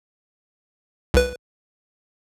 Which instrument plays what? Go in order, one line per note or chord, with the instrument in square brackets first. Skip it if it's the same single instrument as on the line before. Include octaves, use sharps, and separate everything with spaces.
[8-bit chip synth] C2 B4